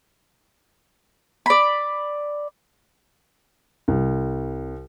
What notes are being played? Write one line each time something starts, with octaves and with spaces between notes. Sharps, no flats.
D5 B5
C2